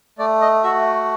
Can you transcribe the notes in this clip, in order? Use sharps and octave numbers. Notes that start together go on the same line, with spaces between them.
A3 D5
D#5
F#4 E5